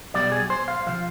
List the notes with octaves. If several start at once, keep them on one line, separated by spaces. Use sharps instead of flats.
B1 B2 G3 D5
G#4
C5
F5
C3 F3 F5